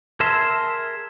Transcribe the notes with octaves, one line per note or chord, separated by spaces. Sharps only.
G#4 A#4 E5 A5 C6